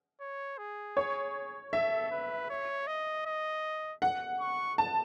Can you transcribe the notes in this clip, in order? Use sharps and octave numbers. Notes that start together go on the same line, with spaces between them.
C#5
G#4
C#5
A4 E5
B4
C#5
D#5
D#5
F#5
C#6
A5